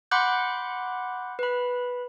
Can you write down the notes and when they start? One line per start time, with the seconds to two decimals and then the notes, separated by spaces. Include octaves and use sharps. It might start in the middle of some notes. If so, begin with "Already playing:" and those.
0.11 F#5 B5 C6 D6 F#6 G6
1.39 B4 B5